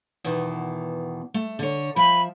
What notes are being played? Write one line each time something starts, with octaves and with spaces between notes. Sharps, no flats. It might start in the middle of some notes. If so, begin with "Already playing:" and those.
E2 B2 D#3
A3
D3 C#5
F3 E5 B5